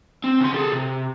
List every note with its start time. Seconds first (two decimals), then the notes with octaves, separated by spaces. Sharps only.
0.24 C4
0.41 C#3 C6
0.54 G#4 A4
0.72 C3